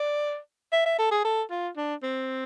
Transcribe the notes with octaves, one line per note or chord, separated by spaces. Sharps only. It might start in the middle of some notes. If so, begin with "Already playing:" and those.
Already playing: D5
E5
E5
A4
G#4
A4
F4
D4
C4